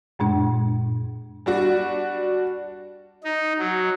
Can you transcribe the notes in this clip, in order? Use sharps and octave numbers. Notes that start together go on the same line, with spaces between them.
F#2 A#2 G#3 D4
G3 D4 F#4
D#4
F#3